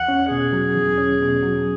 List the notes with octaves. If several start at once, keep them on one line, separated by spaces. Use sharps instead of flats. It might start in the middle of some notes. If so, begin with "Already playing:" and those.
Already playing: E2 F#5
C#4
B2 G#4
F#3
E2
C#4
B2
F#3